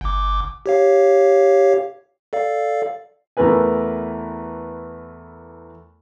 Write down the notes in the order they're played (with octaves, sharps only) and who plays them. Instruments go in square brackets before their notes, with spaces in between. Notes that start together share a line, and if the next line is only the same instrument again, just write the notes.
[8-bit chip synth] G1 D6
G4 C#5 F5
A4 D5 F5
[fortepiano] E2 E3 A3 A#4 B4 G#5